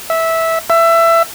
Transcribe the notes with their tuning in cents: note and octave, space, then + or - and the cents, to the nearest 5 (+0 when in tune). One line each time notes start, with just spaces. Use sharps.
E5 -10
E5 +20